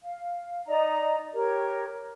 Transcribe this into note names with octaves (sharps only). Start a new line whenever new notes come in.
F5
D#4 D5 D#5 A#5
G4 A#4 C#5